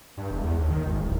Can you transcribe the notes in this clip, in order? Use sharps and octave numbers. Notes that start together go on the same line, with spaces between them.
G2
E1
E2
D#2
D#3
G#1
D1